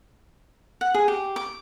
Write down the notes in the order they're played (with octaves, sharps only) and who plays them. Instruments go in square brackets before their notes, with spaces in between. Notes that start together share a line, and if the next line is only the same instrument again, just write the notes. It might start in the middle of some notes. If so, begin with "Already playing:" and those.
[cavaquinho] F#5
G#4
G4
D6